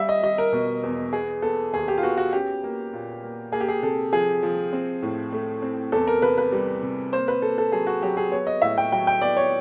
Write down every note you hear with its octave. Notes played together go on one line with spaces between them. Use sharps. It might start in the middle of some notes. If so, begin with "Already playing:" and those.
Already playing: G3 E5
D#5
G3 D#5
A#4
B2
E2
B3 G#4
B3 A4
D#2 G#4
G4
F4
B3 F#4
F#4
C#4 G4
A#3
A#2
A#3
A#3 G#4
G4
G#4
C3 A4
F3 G#4
F3
C4
A2
A3
C4
E2 A4
A#4
C3 B4
B4
G3
C3
A#3 C5
B4
A#3 A4
A4
F#3 G#4
F#4
F#3 G4
G#4
B3 C#5
D#5
A2 E5
G5
F#3 G5
G5
B3 D5
C#5